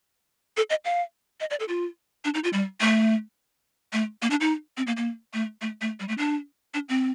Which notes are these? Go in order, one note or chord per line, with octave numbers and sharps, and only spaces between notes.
A4
D#5
F5
D#5
D5
A4
F4
D4
D#4
F4
G3
A3
A3
A#3
D4
D#4
C4
A#3
A#3
A3
A3
A3
G3
A3
D4
D4
C4